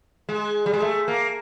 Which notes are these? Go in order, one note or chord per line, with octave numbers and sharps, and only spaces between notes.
G#3
G3
G#3
A3
A#3